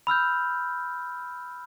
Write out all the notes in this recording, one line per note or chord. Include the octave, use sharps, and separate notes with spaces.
B5 E6 F6 G6